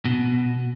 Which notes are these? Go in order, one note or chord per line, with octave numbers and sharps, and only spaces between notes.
B2